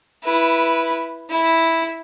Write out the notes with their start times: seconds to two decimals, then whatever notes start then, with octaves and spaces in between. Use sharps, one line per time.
0.24 E4 B4
1.30 E4